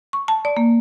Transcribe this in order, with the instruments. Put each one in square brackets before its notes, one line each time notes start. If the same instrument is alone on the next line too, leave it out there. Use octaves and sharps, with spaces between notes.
[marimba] C#6
A5
D5
A#3